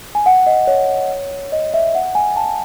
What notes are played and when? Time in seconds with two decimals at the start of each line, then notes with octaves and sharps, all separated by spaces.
0.15 G#5
0.26 F#5
0.46 D#5
0.67 C#5
1.52 D#5
1.74 E5
1.95 F#5
2.15 G#5
2.36 A5